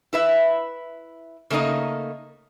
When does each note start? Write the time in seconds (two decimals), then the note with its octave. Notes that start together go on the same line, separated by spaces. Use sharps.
0.13 E4 B4 E5
1.50 C#3 A3 A#3 D#4 D#5